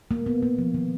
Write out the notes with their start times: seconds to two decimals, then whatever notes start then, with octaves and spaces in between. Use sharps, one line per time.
0.11 A#3
0.26 B3
0.42 A#3
0.58 F3
0.74 D#3